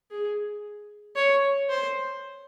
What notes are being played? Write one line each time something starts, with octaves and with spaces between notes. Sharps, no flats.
G#4
C#5
C5